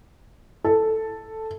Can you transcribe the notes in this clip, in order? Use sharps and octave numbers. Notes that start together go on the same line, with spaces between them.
A4